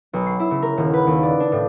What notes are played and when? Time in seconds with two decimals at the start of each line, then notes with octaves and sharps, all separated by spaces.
0.13 B1
0.26 C7
0.40 E4
0.51 C#3
0.62 A#4
0.77 D#1
0.94 B4
1.06 D#2
1.23 D5
1.40 D4
1.52 A2